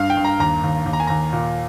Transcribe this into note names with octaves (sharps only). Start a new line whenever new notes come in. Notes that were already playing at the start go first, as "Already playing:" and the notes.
Already playing: G2 F5
G5
G2
A#5
D#2 A#5
D#2
D#2
A#5
G#5
D#2 A#5
A#2